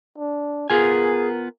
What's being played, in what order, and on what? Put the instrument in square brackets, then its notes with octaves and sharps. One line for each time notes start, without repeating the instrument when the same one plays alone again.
[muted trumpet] D4
[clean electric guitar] B3 F4 G#5 [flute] G#4 [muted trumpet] A#4